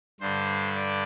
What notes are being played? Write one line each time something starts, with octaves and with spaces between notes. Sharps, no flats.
G2 D3 G3 C5
D5